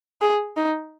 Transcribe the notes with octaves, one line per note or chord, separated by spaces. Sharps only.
G#4
D#4